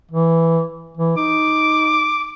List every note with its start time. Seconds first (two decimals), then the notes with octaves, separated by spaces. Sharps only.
0.12 E3
0.97 E3
1.17 D#4 D6